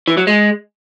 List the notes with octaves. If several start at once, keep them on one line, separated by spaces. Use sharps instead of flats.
E3
F#3
G#3